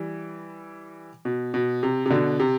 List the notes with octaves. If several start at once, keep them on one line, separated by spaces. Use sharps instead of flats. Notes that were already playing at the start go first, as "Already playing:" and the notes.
Already playing: E3 G3
B2
B2
C3
C3
B2 D3
C3